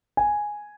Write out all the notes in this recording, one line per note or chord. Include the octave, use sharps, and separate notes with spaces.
G#5